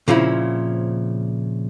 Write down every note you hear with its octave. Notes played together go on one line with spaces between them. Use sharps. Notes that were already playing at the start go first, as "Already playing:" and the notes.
A#2 C#3 F3 C4 E4